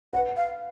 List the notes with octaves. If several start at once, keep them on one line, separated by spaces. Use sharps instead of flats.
B4 F#5
F5